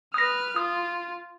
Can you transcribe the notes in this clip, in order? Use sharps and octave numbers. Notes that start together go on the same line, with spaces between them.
B4 D#6 F6 A#6
F4 D#6